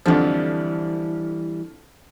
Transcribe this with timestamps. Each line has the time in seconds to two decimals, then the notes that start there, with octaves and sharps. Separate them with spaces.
0.06 F2 D3 E3 F3 G3